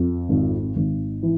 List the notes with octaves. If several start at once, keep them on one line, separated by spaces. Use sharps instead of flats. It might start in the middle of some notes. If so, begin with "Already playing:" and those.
Already playing: F2
G#1
G#1
E3